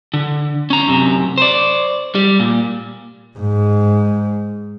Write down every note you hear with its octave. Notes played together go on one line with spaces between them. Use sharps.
D3
C#4 A#5
F#2 C3
C5 D5
G3
A#2
G#2